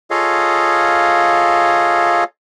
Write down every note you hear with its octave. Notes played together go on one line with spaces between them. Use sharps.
F4 G#4 A4 C#5 D#5 F5